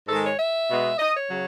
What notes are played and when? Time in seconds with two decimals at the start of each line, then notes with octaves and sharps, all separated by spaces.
0.08 G#2 D#3 G#3 A4
0.24 C#5
0.38 E5
0.69 B2 G#3 B3
0.98 D#5
1.14 C#5
1.29 C#3 F#3